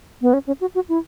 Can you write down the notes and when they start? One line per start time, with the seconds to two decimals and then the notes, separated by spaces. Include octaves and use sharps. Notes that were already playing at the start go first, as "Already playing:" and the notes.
0.21 B3
0.33 C#4
0.47 C#4
0.61 F#4
0.75 F#4
0.89 E4